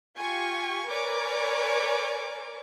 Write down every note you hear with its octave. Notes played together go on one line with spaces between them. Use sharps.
F4 G4 G#5 C#6
A#4 B4 C#5 D5 G#5 D6